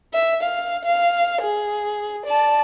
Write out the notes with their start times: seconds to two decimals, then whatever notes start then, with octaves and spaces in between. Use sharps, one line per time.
0.14 E5
0.43 F5
0.86 F5
1.42 G#4
2.26 D5 A5